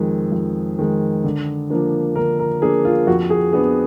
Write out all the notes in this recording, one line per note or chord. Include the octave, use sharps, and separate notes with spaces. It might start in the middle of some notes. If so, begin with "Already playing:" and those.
Already playing: F2 D#3 G#3
F2
D#3 G#3
D3
F3 A#3 D4
D3 A#4
A#4
F3 A#3 D4 G#4
F4
F2 F#4
G#4
F3 B3 D4 G#4